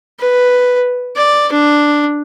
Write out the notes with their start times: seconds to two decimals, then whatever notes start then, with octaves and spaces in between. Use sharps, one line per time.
0.19 B4
1.16 D5
1.52 D4